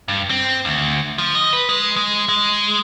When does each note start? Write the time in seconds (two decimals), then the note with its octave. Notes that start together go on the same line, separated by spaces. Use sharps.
0.08 G2
0.30 C4
0.65 D2
1.18 F3
1.35 D#5
1.53 B4
1.69 G#3
1.96 G#3
2.29 G#3